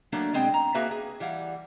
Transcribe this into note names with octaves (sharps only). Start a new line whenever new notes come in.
F#3 A3 A#3 D4
B2 G#3 C4 G5
A#5
A#3 F#4 G#4 B4 E5 A5
G#4
E3 G3 F5 F#5